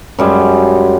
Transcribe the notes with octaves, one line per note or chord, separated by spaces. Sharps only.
F#2 G3 G#3